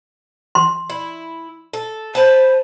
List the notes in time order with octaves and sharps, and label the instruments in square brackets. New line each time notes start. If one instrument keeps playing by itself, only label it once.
[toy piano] C6
[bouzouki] E4
A4
[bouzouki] B4 A5 [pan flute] C5